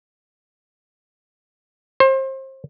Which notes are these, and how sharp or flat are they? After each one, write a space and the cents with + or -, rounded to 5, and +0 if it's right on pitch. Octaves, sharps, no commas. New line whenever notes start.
C5 +30